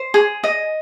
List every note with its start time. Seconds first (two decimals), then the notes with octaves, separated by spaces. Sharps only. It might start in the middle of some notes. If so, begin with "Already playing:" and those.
Already playing: C5
0.14 G#4
0.44 D#5